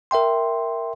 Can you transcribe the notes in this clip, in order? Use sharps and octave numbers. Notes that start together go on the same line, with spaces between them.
A#4 E5 G5 C6